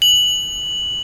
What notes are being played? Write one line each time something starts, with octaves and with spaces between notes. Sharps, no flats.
F#7